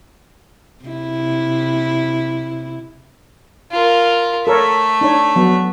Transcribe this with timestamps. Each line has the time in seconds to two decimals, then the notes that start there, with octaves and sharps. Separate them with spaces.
0.85 C3 E4
3.72 F4 A#4
4.47 A3 A4 A#4 C#5 E5
5.01 D4 D#4 C#5
5.36 F#3 B3